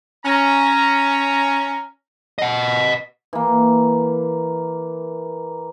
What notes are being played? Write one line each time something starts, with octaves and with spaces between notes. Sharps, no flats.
C#4 A#5
D#5 F#5
E3 A#3